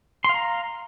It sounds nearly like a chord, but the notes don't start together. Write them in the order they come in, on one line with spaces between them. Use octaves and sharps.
C6 F5 A#5